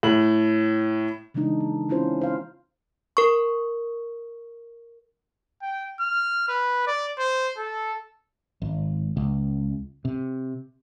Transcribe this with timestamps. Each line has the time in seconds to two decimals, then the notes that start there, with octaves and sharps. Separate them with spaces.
0.03 A2 F#7
1.34 C#3 E3 G#3 D4 D#4
1.60 A#3
1.89 C4 C#4 E4 F4 C5
2.21 C5 F5
3.17 A#4 C#6
5.62 G5
6.00 F6
6.49 B4
6.87 D5
7.19 C5
7.57 A4
8.62 G#1
9.17 C#2
10.05 C3